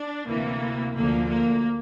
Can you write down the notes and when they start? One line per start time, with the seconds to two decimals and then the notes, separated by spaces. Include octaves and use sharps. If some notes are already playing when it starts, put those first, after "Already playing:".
Already playing: D4
0.28 D2 C3 E3 A#3
0.96 D2 D3 F3 A#3
1.30 A#3